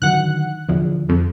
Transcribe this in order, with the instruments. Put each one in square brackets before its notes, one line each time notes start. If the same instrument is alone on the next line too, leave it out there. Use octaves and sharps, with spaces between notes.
[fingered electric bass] D3 D#3 F#3 [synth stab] F#5 F#6
[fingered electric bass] D#1 D3 F3 [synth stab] E2
[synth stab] F2